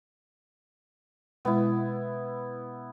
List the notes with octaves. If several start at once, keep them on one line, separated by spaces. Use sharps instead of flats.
B2 G#3 B3 E4